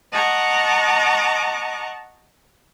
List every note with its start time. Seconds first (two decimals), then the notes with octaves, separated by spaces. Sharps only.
0.12 D#5 F#5 A5 A#5 C#6 D6